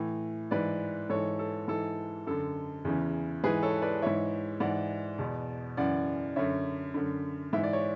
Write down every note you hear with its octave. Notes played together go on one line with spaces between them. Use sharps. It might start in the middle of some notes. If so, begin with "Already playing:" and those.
Already playing: A2 E3
G#2 E3 B4 D5
G#2 E3 A4 C#5
A4
G#2 E3 A4
F#2 D3 A4
E2 C#3 E3
G#2 E3 G#4 B4
A4 C#5
B4 D5
G#2 E3 C#5 E5
G#2 E3 D5 F#5
E2 B2
F#2 C#3 E3 D5 F#5
F#2 D3 C#5 E5
F#2 D3
G#2 E3 E5
D5
C#5